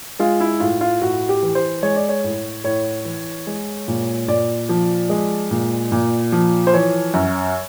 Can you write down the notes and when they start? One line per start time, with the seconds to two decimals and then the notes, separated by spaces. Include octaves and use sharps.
0.19 G#3 F4
0.40 E4
0.60 A2 F4
0.81 F4
1.02 A2 F#4
1.29 G4
1.43 E3
1.55 C5
1.82 G#3 C#5
1.96 D5
2.09 C#5
2.24 A2
2.64 A2 C#5
3.05 E3
3.47 G#3
3.88 A#2
4.28 A#2 D5
4.69 F3
5.09 G#3
5.51 A#2
5.92 A#2
6.32 F3
6.67 C5
6.73 E3 C#5
7.14 F#2